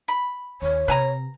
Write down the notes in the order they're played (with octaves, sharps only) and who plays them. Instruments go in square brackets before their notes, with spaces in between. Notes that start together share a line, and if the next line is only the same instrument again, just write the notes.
[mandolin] B5
[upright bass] D#2 [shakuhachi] C#5
[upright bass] C3 [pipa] B4 G#5 A#5